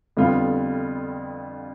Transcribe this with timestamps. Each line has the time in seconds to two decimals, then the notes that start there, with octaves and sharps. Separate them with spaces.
0.17 F2 D3 G3 B3 F4